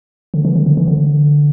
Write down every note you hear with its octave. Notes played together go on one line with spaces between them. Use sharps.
D3
E3
D3
D3
E3
D3